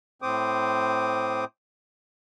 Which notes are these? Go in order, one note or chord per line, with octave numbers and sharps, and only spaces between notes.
A2 C4 C5 D6 D#6